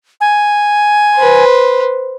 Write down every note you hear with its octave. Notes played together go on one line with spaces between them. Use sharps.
G#5
B4 C5